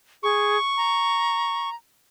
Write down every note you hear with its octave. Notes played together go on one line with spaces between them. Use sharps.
G#4 C#6
A#5